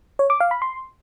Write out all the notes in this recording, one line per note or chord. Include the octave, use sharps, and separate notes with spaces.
C#5
D6
F5
B5
C6